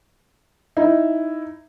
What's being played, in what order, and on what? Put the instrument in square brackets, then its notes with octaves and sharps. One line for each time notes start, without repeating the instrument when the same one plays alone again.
[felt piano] D#4 E4